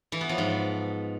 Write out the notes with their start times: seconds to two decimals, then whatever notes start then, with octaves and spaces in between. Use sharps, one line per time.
0.12 E3
0.21 B3
0.29 F3
0.38 G#2